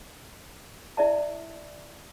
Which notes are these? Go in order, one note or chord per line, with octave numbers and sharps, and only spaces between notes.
E4 D5 E5 A5